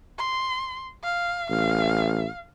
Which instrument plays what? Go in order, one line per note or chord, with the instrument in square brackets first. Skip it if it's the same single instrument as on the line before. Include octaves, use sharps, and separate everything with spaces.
[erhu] C6
F5
[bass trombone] A1 [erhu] F5